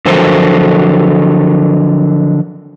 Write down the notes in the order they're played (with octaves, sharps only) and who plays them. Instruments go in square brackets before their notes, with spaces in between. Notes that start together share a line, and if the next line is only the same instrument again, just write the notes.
[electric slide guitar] D3 F3 F#3 A4 A#4 C5